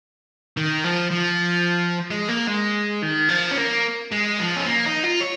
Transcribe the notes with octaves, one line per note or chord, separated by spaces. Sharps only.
D#3
F3
F3
G#3
A#3
G#3
D#3
F3
C#4
A#3
G#3
F3
C#4
A#3
D#4
F4
C#5